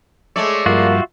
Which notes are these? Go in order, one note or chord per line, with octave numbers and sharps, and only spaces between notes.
G#3 A3 C#5 D5 E5
G2 F3 A#3 F4 F#4 E5